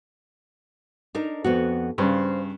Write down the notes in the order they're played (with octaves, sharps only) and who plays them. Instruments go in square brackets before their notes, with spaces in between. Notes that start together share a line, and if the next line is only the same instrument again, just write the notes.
[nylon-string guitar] D4 D#4 A#4
F2 B3 F#4
[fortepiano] G2 C#3 [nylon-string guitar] C5